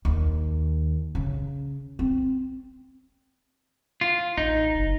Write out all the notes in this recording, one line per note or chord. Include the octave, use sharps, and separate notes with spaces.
D#2
C#3
C4
F4
A1 D#4
F#1